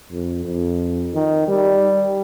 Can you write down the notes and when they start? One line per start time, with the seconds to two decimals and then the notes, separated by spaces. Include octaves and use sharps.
0.11 F2
0.45 F2
1.14 D#3
1.48 G3